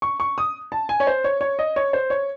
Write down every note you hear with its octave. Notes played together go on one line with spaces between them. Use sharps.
C#6
C#6
D#6
A5
G#5
C#5
C5
C#5
C#5
D#5
C#5
C5
C#5